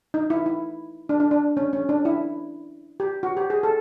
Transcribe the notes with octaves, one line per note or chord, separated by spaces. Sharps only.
D#4
E4
E4
D4
D4
D4
C#4
C#4
D4
E4
G4
F#4
G4
G#4
A4